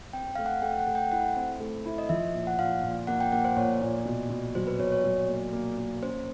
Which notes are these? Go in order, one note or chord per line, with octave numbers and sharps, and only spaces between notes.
C4 G5
A3 F5
F#5
A3 G5
F#5
A3
G5
E4 F#5
C4
A3
E4
D#5
F3 E5
A#2
F#5
A#2 F5
A#2
A#3 F#5
G5
A#3 F#5
C5
A#2 C#5
A#2
B2
B2
F#3 C5
B4
B2 C#5
C#5
F#3
A#3
A#3
A#3
C#4 C5